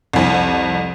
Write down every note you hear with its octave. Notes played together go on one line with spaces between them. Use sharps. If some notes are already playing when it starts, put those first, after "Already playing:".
C2 F2